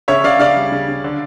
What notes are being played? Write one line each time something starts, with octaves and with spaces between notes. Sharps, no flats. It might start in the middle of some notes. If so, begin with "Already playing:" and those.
C#3 C#5 E5
C#3 D5 F5
C#3 D5 F5
G3
C#3
C#3
D3